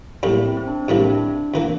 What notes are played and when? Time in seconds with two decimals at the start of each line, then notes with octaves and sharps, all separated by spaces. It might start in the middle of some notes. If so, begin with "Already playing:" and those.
0.23 A#1 A2 G3 A#3 E4
0.45 C4
0.57 C4
0.67 D4
0.88 A#1 A2 G3 A#3 E4
0.96 D4
1.02 C4
1.10 D4
1.54 F2 E3 A#3